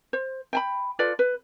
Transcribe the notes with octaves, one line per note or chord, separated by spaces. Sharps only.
C5
G5 G#5 B5
F4 A4 B4 D5
B4